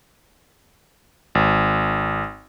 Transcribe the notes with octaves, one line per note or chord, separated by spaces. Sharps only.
G#1